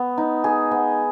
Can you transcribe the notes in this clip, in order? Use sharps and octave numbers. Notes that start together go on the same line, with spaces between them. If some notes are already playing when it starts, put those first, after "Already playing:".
Already playing: B3
D#4
G#4
B3